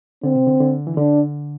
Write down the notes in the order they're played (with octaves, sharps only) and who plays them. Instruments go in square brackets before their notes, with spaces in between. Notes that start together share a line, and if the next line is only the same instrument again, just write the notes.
[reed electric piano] D3 [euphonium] C4
[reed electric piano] C3
D3
D3
E3
[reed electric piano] D3 [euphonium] D4